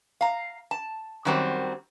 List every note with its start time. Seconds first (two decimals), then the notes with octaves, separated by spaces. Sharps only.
0.21 F5 A#5
0.71 A5
1.25 F#2 D#3 F#3 G3 C4